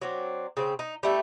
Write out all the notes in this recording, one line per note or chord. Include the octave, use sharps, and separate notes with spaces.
F#3 C4 D4
C#3 C4
D#4
G3 A3 E4